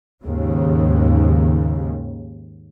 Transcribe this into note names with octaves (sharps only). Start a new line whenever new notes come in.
D#2 G#2 C#3